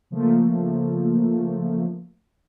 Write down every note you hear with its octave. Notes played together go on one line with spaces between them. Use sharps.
C#3 F3 A3 A#3